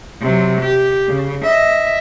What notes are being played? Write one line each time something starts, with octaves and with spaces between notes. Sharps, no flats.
C3 F#3
G4
C#3
D#5 E5